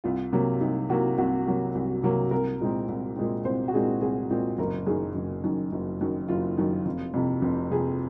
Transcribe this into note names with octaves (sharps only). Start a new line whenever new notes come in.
C2 F4
C3 F#3 A#3
C2 D#4
C3 F#3 A#3 F#4
C2 F#4
C3 F#3 A#3
C2
C3 F#3 A#3
C2 A#4
A#2 G#3 C4
C2
A#2 G#3 C4
C2 C5
F#4
A#2 G#3 C4 G#4
C2 G#4
A#2 G#3 C4
F#1 A#4
F#2 D#3 G#4
F#1
F#2 D#3
F#1
F#2 D#3
F#1 F4
F#2 D#3
F1
F2 C3
F1
F2 C3 G#4